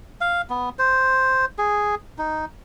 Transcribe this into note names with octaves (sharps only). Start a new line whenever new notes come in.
F5
B3
C5
G#4
D#4